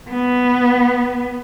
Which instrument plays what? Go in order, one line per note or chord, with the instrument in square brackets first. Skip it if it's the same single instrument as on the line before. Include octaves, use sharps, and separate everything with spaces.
[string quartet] B3